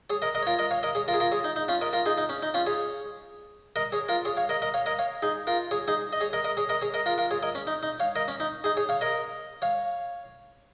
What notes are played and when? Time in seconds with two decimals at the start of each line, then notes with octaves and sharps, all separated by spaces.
0.10 G#4 C#5
0.22 A#4 D#5
0.35 A#4 D#5
0.43 C#5
0.47 F4 A#4
0.59 A#4 D#5
0.71 C#5 F5
0.83 A#4 D#5
0.95 G#4 C#5
1.08 F4 A#4
1.14 G#4
1.20 F4 A#4
1.32 G#4 C#5
1.44 D#4
1.56 D#4
1.68 C#4 F4
1.81 A#4 D#5
1.93 F4 A#4
2.06 D#4 G#4
2.18 D#4
2.29 C#4
2.42 D#4
2.54 C#4 F4
2.66 G#4 C#5
3.76 A#4 D#5
3.92 G#4 C#5
4.09 F4 A#4
4.25 G#4 C#5
4.37 C#5 F5
4.49 A#4 D#5
4.62 A#4 D#5
4.74 C#5 F5
4.86 A#4 D#5
4.99 C#5 F5
5.23 D#4 G#4
5.47 F4 A#4
5.71 G#4 C#5
5.88 D#4 G#4
6.13 D#5
6.21 G#4 C#5
6.33 A#4 D#5
6.44 A#4 D#5
6.57 G#4 C#5
6.69 A#4 D#5
6.82 G#4 C#5
6.94 A#4 D#5
7.06 F4 A#4
7.18 F4 A#4
7.31 G#4 C#5
7.43 A#4 D#5
7.55 C#4
7.67 D#4
7.83 D#4
8.00 C#5 F5
8.16 A#4 D#5
8.28 C#4
8.40 D#4
8.64 D#4 G#4
8.77 G#4 C#5
8.89 C#5 F5
9.01 A#4 D#5
9.62 C#5 F5